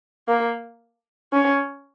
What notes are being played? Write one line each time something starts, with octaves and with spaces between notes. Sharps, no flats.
A#3
C#4